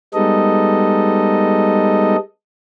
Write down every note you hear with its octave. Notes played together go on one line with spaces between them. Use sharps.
G3 G#3 B3 D#4 A4 D#5